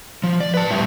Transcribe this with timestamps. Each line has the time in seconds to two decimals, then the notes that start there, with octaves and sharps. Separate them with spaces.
0.24 F3
0.40 D5
0.54 B4 A5
0.70 A2 G3 G4 E5